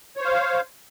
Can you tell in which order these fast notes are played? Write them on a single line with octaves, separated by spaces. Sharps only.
C#5 C5 F5